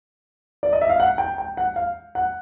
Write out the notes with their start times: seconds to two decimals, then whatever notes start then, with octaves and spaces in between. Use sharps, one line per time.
0.63 D5
0.73 D#5
0.81 E5
0.89 F5
1.00 F#5
1.18 G5
1.38 G5
1.57 F#5
1.76 F5
2.15 F#5